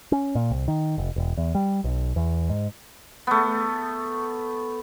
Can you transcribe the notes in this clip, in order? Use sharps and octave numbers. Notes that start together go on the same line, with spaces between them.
C#4
A#2
C2
D#3
F1
E1
E2
G3
B1
E2
G#2
A3 B3